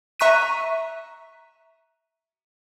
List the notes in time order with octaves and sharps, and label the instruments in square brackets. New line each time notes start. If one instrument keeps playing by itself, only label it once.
[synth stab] E5 A#5 C#6 F#6 B6 D#7